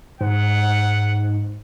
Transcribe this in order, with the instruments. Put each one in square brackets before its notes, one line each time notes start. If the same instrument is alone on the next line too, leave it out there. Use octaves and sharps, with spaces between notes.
[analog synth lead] G#2 [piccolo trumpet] F#5